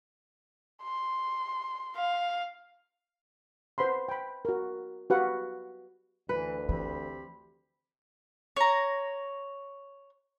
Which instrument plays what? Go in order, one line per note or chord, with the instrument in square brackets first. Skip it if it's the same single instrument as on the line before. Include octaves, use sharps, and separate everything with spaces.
[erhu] C6
[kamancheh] F5
[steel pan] B4 C5 F#5 B5 C6
G5 B5
F#4 A#4
F#4 G4 B4 F5 F#5
[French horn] D2 [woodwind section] E3 [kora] B4
[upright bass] E3 [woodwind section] C4 G4 B5
[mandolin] C#5 A#5